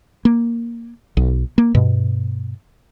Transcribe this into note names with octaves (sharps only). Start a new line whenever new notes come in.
A#3
B1
A#3
G2 B2